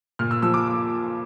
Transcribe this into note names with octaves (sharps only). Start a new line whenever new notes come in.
A#2 F6
E6
F3 E6
D6